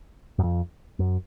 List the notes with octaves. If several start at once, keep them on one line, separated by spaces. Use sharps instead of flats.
F#2
F2
F#2